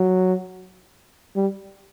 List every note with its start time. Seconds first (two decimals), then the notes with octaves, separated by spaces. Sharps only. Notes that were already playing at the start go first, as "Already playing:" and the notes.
Already playing: F#3
1.36 G3